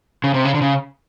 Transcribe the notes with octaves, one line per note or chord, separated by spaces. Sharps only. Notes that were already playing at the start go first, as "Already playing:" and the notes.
C#3
C3
C#3
D3
C#3